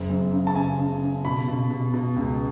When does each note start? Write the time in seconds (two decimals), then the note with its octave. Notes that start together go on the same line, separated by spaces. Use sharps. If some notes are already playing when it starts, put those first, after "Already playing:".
Already playing: F#1
0.10 F#2
0.33 C#3
0.47 A5
0.56 C#3 G#5
0.79 C#3
1.02 C#3
1.25 B2 B5
1.48 B2
1.71 B2
1.94 B2
2.16 C#2